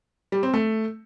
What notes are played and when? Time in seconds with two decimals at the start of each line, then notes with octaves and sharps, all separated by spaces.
0.32 G3
0.43 C4
0.54 A3